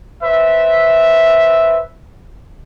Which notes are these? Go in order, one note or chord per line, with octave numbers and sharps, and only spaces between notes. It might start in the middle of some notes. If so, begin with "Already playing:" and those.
B4 C5 E5